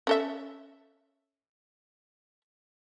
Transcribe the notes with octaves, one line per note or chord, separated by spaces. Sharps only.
C#4 A4 E5